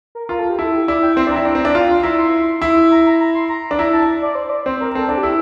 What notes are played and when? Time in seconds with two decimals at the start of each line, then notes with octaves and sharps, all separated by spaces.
0.15 A#4
0.29 F4 A#4
0.39 A4
0.49 G4
0.59 E4 A4
0.88 E4 D5
1.02 G5
1.16 C4 C6
1.27 D4
1.31 A#5
1.36 E4
1.45 D4
1.55 C4
1.65 D4
1.75 F4
1.90 C6
2.03 E4 A#5
2.18 C6
2.62 E4
2.91 A#5
3.06 A#5
3.20 A#5
3.35 C6
3.49 A#5
3.71 D4
3.79 E4 A#5
3.93 A5
4.22 D5
4.35 C5
4.49 D5
4.66 C4 C5
4.81 A#4
4.95 C4 A4
5.09 D4 A4
5.18 G4
5.23 E4